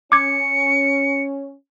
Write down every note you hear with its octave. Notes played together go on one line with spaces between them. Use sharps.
C#4 D6 G#6 C#7